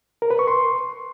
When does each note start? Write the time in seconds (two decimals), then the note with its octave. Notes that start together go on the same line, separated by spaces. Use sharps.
0.22 A#4
0.31 B4
0.39 C#6
0.48 C6